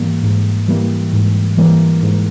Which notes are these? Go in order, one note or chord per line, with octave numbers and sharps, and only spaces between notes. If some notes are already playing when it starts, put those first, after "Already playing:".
Already playing: G#2 E3 G3 A#3
G#2
E3 G3 A#3
G#2
E3 G3 A#3
G#2